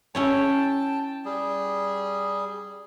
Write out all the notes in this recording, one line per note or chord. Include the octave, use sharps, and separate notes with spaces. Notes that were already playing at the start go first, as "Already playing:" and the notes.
C#4 E4 C#5 G5 A5
G3 G#4